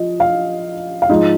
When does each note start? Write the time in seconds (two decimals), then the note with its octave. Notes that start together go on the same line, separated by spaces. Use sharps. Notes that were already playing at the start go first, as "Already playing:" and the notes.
Already playing: F3 D#5
0.20 F5
1.02 F5
1.09 G#2 F3 D#5